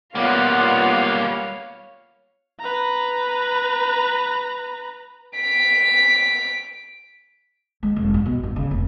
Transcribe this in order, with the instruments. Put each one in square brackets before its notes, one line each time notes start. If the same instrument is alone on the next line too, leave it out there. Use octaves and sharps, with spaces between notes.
[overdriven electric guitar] G3 A#3 [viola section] B3 F4 F#5 [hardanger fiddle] C#5 F5
[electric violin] B4 A#5
[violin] B6 D7
[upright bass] G#3
F1
G2
B2
G2
C#3
F1